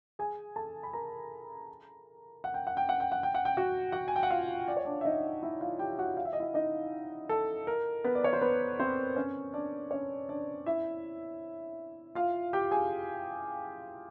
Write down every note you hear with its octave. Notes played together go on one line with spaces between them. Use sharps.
G#4 G#5
A4 A5
B5
A#4 A#5
F#5
G5
F#5
G5
F#5
G5
F#5
G5
F#5
G5
F#4 F#5
F#4 F#5
G#5
G5
F#5
F4 F5
D5
C#5
D4 D5
E5
D#4 D#5
E4 E5
F4 F5
G4 G5
F#4 F#5
F5
E5
D#5
E4 E5
D#4 D#5
A4
A#4
B3 B4
D5
C#5
C5
B3 B4
C4 C5
C#4 C#5
D4 D5
C#4 C#5
D4 D5
E4 E5
F4 F5
G4 G5
G#4 G#5